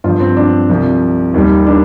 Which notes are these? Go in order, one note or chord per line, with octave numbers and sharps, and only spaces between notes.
G2 F3 F4
C4
D4
C2 C3 F3
D#2 D#3 G3
D4